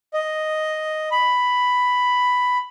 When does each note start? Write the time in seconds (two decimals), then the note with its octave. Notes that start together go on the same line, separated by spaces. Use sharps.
0.14 D#5
1.11 B5